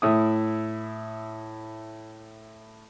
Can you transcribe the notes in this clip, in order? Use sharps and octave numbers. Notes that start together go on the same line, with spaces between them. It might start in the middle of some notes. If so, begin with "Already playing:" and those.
A2 E4 D#6